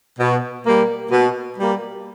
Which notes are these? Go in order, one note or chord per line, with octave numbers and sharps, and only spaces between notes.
B2
G3 A#3
B2
G3 A#3